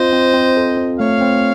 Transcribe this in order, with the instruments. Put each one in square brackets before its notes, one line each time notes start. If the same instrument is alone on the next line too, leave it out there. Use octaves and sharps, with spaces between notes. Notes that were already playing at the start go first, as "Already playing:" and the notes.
Already playing: [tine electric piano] C4 F4 [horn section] C5 D#5
[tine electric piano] C4
C4
A4
C4
[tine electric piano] A3 [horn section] C#5 F5
[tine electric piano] C4